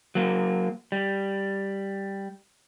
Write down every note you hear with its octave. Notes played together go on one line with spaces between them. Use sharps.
F#3 A#3
G3